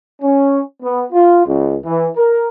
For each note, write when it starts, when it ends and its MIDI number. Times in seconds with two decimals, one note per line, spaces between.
0.22 0.61 61
0.83 1.05 59
1.13 1.45 65
1.45 1.76 37
1.85 2.08 52
2.17 2.49 70